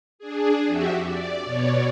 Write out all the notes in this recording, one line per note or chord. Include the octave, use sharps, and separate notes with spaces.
D4 G#4
F2 F#4 G4 E5
D5
B2 C#5 D5